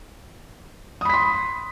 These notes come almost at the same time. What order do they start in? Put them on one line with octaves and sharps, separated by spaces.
D#6 B5 B6 C6